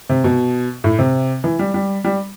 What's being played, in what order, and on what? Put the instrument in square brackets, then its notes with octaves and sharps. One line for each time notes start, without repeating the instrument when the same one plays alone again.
[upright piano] C3
B2
A2
C3
E3
G3
G3
G3